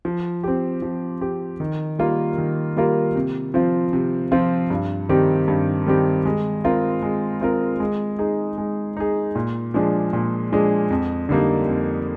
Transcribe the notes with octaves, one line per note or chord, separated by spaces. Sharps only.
F3
C4 G4
F3
C4 G4
D#3
G3 A#3 F4 A#4
D#3
G3 A#3 F4 A#4
C3
F3 C4 F4
C3
F3 C4 F4
G2
D#3 G3 C4 G4
G2
D#3 G3 C4 G4
G#3
C4 F4 A#4
G#3
C4 F4 A#4
G#3
D#4 G#4
G#3
D#4 G#4
A#2
F3 G#3 D4 G#4
A#2
F3 G#3 D4 G#4
F2
D3 G3 A#3 D#4
F2